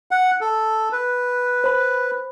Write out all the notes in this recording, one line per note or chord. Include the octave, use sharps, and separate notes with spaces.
F#5
A4
B4
C5 B5